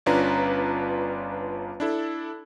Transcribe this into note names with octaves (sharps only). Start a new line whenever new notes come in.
G1 C#4 D4 F4 B4 A#5
D4 E4 A4